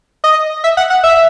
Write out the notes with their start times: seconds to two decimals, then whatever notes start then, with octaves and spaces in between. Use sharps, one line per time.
0.24 D#5
0.64 E5
0.77 F#5
0.90 F#5
1.04 E5